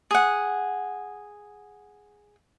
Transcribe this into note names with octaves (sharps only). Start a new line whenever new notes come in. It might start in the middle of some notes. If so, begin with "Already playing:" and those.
G#4 F#5